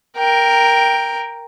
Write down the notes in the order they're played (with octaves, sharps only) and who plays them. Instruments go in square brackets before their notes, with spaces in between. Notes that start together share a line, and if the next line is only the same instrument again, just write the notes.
[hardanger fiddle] A#4 G5